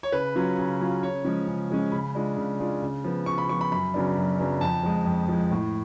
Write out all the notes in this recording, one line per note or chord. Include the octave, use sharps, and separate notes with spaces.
C#5
C#3 B4
F#3 C#4 F4
C#3
F#3 C#4 F4
C#3 C#5
F3 G#3 C#4
C#3
F3 G#3 C#4
C#3 B5
G#3 D4 F4
C#3
G#3 D4 F4
C#3
F3 B3
C#3 C#6
B5
F3 B3 C#6
B5
F#2 B5
C#3 F#3 B3 D4
F#2
C#3 F#3 B3 D4
F2 A5
F3 G#3
F2
F3 G#3
A2